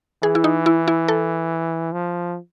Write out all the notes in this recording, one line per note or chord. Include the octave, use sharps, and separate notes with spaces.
E3 G#4
E4
D#4
E4
E4
A4
F3